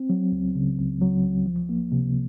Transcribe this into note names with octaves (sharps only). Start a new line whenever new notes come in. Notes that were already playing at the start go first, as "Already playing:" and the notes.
Already playing: C4
F#3
C#2
C#3
C#2
F#3
C#2
F3
A#3
C3